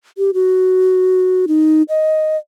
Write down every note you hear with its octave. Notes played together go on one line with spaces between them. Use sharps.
G4
F#4
D#4
D#5